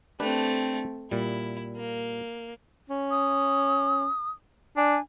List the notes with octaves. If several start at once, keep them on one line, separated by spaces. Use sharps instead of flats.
A3 C4 D4 G4 B4
A#2 G3 E4
A#3
C#4
D#6
D4 G#5